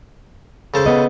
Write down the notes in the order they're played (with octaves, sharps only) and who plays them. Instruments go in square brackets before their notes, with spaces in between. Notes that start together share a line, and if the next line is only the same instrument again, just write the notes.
[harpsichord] C#3 A4 C5
[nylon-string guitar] B3 D#5